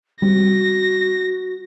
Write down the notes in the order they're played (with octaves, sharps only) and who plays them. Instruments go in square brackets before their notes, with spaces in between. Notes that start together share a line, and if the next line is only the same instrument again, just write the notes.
[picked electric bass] G3 C4 [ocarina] F#4 [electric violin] A#6